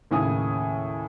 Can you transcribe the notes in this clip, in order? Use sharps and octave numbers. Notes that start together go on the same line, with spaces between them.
D#2 A2 C#3 G#5 D#6